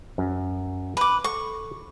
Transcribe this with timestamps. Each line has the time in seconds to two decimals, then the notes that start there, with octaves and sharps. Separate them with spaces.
0.18 F#2
0.97 B4 D6
1.24 A4 C#6